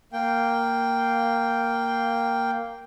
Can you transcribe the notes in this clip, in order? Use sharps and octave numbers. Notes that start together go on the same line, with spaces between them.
A#3 G5